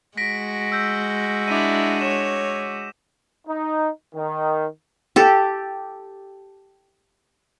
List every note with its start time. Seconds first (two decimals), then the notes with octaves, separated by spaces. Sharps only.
0.17 G#3 F#4 A#6 B6 D7
0.72 E6 G6
1.48 D4 E4 D6 B6 D#7
2.01 C#5 E7
3.48 D#4
4.15 D#3
5.16 G4 A4